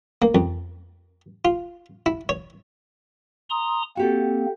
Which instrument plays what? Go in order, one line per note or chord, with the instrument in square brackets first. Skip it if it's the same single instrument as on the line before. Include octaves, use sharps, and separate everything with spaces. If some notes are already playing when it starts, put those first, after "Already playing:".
[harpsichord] A#3
F2
F4
E4
C#5
[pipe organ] A#5 C6 D#6
[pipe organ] A#3 C4 [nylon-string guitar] F#4 G4 A4